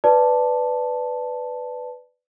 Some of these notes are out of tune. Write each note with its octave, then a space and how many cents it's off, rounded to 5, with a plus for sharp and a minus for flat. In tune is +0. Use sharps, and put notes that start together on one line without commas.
B4 +10 D5 +0 A5 +0